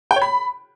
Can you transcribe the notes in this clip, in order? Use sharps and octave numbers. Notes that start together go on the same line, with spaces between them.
G5
C#5
B5